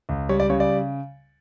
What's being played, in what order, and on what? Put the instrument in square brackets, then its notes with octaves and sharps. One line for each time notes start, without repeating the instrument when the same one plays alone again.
[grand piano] C#2
G3 C#5
D5
C#3 C#5
D5